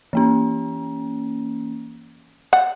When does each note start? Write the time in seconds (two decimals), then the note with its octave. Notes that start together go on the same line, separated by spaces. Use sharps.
0.13 E3 A#3 C#4
2.53 F#5